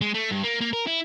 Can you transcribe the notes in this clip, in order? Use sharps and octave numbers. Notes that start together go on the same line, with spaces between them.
G#3
A3
G2
A#3
A#3
A#4
E4